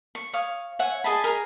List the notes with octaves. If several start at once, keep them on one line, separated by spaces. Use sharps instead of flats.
C#6
C#5 F5 D#6
C#5 E5 F#5 G#5
G#4 D#5 A5 B5
G#4 A#4